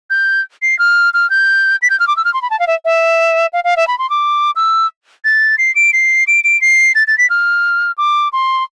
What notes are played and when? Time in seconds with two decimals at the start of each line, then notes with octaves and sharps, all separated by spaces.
0.10 G6
0.62 C7
0.79 F6
1.14 F6
1.30 G6
1.82 B6
1.90 G6
2.00 F6
2.07 D6
2.17 E6
2.25 F6
2.34 C6
2.42 B5
2.50 A5
2.60 F5
2.67 E5
2.85 E5
3.53 F5
3.64 F5
3.77 E5
3.87 B5
3.99 C6
4.10 D6
4.56 E6
5.25 A6
5.58 C7
5.76 D7
5.93 C7
6.27 D7
6.44 D7
6.61 C7
6.95 A6
7.07 A6
7.18 B6
7.30 F6
7.98 D6
8.33 C6